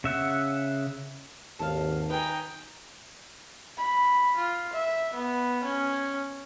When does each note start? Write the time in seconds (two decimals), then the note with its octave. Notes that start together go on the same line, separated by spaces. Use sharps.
0.04 C#3 E5 F#5
1.59 G#1 D#2 A4 F5
2.10 D#4 B4 G5 G#5
3.77 B5
4.37 F4
4.73 E5
5.14 B3
5.64 C#4